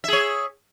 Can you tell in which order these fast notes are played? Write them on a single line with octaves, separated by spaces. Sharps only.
E5 G#4 C#5